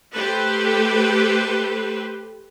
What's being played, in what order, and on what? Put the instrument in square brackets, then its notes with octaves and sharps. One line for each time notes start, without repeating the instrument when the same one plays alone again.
[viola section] A3 G4 A4 B4 C5